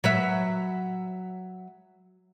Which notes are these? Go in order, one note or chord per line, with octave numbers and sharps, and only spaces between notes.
F#3 B4 E5